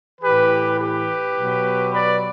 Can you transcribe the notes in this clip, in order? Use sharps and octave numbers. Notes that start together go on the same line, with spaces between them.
A2 E3 G4 B4
G4 B4
B2 F#3
B4 D5